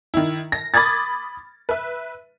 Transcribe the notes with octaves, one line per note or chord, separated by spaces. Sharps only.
D#3 E4
A#6
B5 D6 D#6 G#6 A6
B4 E5